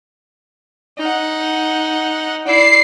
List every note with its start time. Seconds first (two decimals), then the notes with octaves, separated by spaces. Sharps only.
0.98 D#4 F#5
2.46 E4 D5 C7